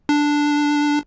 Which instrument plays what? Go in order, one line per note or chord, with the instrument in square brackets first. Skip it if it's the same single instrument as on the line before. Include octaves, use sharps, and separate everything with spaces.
[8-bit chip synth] D4